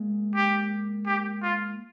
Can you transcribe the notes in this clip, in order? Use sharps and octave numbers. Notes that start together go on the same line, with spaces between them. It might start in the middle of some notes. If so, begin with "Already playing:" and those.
Already playing: G#3 A#3
G4
G4
F4